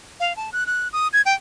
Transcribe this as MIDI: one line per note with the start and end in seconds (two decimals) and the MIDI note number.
0.20 0.35 77
0.36 0.50 81
0.53 0.67 90
0.67 0.88 90
0.93 1.08 87
1.13 1.22 92
1.26 1.34 79